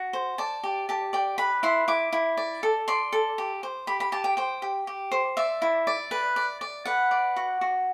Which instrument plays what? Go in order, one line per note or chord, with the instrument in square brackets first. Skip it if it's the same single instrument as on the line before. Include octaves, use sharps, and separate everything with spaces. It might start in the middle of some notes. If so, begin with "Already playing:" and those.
Already playing: [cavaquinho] F#4
C5
D5 A5
G4
G4 A5
D5 G5
B4 B5
E4 C6
E4 D6
E4
D5
A4
D5 C6
A4
G4
C5
G4 B5
B5
G4 A5
G5
C5 G5
G4
G4
C5
D5 E5
E4
D5
B4
D5
D5
B4 F#5
D5
F#4
F#4